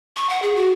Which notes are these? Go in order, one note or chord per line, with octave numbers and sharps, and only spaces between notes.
C#6
F#5
G#4
F#4